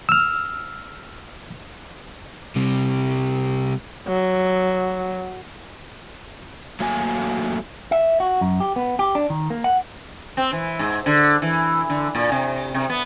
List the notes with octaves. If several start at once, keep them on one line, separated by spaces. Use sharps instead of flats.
E6 F6
C3 G3
F#3
F#3 A3 A#3 F#4 G#5
E5
F#4
F#2
G4
B3
G4
D4
D#3
A#3
F#5
C4
E3
G#2
D3
E3
D3
A#2
C3
C3
B3